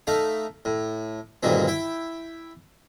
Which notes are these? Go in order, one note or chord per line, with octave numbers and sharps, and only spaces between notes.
A3 D#4 F5
A2
D2 G2 A#2 D#3 C4
E4 G5